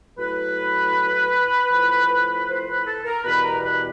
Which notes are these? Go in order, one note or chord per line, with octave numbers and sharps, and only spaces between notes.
A2 F#3 B4
A2 F3
C5
B4
A4
A#4
E2 B2 G3 B4
A#4
B4